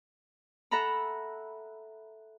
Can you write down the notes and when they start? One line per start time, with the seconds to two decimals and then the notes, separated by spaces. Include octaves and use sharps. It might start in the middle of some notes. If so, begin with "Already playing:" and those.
0.71 A4 E5 F#5 A#5 B5